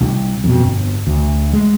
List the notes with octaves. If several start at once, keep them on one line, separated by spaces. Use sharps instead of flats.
C2
F2 B2
G1
D2
G#3